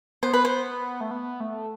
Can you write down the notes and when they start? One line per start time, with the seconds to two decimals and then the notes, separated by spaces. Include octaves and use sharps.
0.23 B3 C5
0.33 B4
0.45 C5
1.01 A3
1.11 B3
1.40 A3